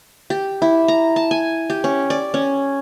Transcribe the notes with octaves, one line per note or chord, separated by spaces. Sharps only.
G4
E4
A#5
A5
G#5
G4
C#4
D5
C#4